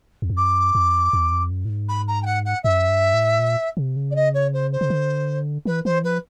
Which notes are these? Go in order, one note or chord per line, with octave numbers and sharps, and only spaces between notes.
E2
F2
F#2 D6
F2
E2
F2
F#2
A2
G#2
B5
A#5
G5
F#5
F#5
F#2 E5
G2
A2
A#2
C3
C#3
D5
D#5
C#5
C5
C5
C#3
D3
E3 B4
E3 C5
F3 B4